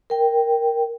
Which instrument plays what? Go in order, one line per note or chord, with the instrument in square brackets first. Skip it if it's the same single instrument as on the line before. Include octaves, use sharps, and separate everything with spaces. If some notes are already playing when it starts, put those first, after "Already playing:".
[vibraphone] A#4 G5